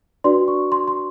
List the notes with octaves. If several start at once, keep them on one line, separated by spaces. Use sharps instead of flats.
D4 F#4 B4 D5 C6
C#6
C6
C6